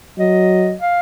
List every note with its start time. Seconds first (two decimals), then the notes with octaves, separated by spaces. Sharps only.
0.19 F#3 D#5
0.81 F5